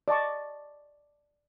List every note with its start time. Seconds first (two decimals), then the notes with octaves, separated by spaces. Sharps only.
0.08 D5 D#5 A5 C#6